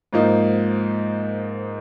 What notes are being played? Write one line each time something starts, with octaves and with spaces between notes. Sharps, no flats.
G#2 F3 A#3 D#4